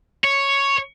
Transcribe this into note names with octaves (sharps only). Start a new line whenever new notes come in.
C#5